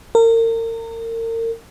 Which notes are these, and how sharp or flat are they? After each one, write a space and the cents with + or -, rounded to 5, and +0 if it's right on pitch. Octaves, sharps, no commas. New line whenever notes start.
A#4 -35